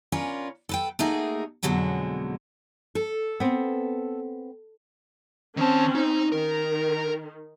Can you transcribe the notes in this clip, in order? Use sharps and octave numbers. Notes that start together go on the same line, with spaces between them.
C#4 D4 F4 A#4 B4
A4 B4 G5
A3 A#3 D#4 F#4 G#4 A#4
F2 B2 D3 F#3 G#3 C#4
A4
B3 C4
D#3 C4 C#4 A5
D#4
D#3 A#4